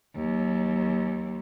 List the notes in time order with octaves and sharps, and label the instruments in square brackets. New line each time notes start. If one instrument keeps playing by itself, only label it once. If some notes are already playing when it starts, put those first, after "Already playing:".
[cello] D#2 F#3